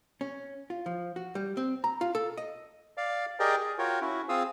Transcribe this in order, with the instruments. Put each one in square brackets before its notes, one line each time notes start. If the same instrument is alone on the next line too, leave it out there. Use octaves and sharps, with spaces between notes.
[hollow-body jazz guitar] C#4
F4
F3
F#4
G3
C4
A#5
F4
A4
D#5
[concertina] D5 F5
G4 G#4 A#4 D5 D#5 G5
G#4
F4 F#4 A#4 C#5 G5
C#4 E4 F#4
C4 F4 G#4 F5 D#6 E6